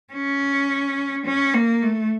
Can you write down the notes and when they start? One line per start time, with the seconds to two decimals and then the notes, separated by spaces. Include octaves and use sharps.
0.13 C#4
1.26 C#4
1.54 A#3
1.82 A3